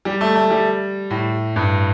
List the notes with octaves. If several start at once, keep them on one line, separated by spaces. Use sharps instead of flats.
G3
A3
A3
G3
A2
G2